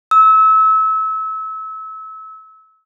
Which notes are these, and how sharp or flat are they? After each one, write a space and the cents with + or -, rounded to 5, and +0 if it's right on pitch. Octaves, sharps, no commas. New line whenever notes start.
E6 -30